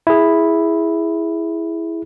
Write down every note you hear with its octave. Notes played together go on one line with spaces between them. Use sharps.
E4 G#4